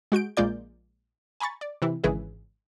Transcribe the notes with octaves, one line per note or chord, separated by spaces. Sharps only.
G#3 F#4 G6 D7
A#1 G#3 A#3 F4 D5 G6
G#5 A#5 B5 C#6 A6
D5
C3 E3 E4
G#1 C#3 E3 E4 G#4 B4